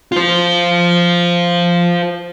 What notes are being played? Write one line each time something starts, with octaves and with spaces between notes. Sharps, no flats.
F4 C5